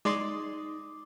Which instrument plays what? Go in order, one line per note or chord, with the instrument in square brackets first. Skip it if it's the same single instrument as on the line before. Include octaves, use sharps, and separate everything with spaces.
[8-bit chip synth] G#3 D5 C6 [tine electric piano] D#4 D#6 [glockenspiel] D6